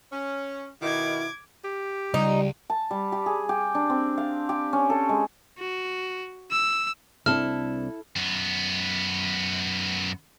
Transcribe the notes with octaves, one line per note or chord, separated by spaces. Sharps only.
C#4
B2 D#3 E4 D6 G#6
G4
C#2 G3 D#4
A5
G3
G4
G#4
G4
D4
C4
F5
G4
C#4
A4
G#3
F#4
E6
C2 C4 D4 E4 A4 F6
F#2 B3